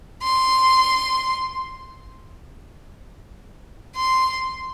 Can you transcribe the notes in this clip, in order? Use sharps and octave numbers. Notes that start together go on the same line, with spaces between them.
C6
C6